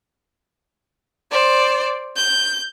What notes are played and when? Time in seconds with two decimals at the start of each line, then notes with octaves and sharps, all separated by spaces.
1.32 C5 D5
2.16 G6